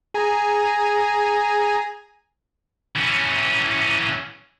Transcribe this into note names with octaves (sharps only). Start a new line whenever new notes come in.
G#4 G#5 A#5
E3 C#4